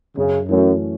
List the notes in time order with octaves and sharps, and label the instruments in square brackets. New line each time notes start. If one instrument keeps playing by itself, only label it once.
[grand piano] F#2 [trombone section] C#3
[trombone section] F#2 [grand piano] E3 A3 C#4 F#4